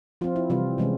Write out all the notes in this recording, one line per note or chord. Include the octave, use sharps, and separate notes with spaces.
F3 C4 F4
E4
C3 E3 G3 C4 F4
C3 E3 G#3 C#4